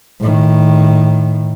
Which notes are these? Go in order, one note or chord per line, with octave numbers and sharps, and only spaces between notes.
A2 D#3